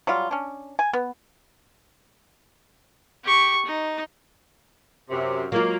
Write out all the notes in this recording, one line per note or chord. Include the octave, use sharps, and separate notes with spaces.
F#3 G3 F4
C#4 D4
G#5
B3
G4 C#6
D#4
F#2 C3
F#3 G#3 A#3 F4